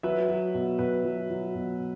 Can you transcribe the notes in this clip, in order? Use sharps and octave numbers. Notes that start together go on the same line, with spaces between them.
F#3 B4 E5
F#3
B2
B2 B4
F#3
F#3
B2